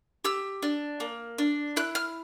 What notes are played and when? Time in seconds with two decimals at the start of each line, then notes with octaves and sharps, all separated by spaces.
0.25 G4 E6
0.63 D4
1.00 A#3
1.38 D4
1.76 E4 F#6
1.95 F6